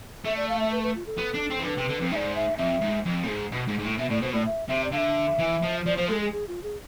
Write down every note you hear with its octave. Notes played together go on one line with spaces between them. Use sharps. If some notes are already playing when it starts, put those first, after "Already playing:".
A3 E5
D5
F5
E5
B4
B4
F4
A4
B3
D4
C4
E3
D3 B4
C3
D3
F2
G#2 D5 E5
E5
F2 E5
G#2
F2
A2
G#2
B2
G#2
G#2
A2
B2 E5
A2 D5
B2 C5
A2 D5
E5
C3 E5
D5
D3 F5
E5
E3
F3
F3 D5
F3 C5
G#3 A4
G#4
G#4
F4
G#4